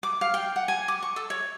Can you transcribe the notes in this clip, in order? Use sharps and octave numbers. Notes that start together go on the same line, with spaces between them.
D6
F5
G5
F#5
G#5
D6
C#6
A4
C#5